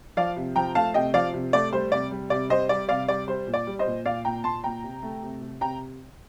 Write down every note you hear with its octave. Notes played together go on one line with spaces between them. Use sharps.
F3 D5 F5
C3
F3 G5 A#5
A3 F5 A5
C3 D#5 G5
F3 D5 F5
C3
A3 D5
G3 C5
C3 D5
G3
C3 D5
G3 C5 D#5
G3 D5
C3 D5 F5
G3 D5
G3 C5
A#2
D5
G3
C5 D#5
A#2
A#2 D5 F5
A#2 G5 A#5
A#2 A5 C6
A#2 G5 A#5
C3
A3
C3
C3
C3 G5 A#5